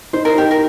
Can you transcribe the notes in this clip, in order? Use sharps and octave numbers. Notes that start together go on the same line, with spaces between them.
D#4 C5
A#4
D#4 G4
A#4